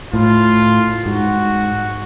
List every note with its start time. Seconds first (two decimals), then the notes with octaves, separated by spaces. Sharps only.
0.13 A2 F4
1.05 G#2 F#4